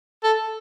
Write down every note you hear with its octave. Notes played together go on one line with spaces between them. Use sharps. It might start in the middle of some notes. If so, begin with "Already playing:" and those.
A4